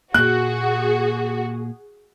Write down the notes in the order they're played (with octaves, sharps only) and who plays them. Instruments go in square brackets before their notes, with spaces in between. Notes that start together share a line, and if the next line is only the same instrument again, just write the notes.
[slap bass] A#2 A#3 [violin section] F#4 [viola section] G#4 [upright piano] F#6